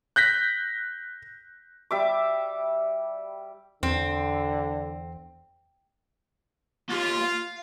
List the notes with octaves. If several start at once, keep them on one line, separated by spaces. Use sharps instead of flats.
F#6 G6 A#6 B6
G3 E5 D6
E2 D3 C4
A#3 F4 G4
F5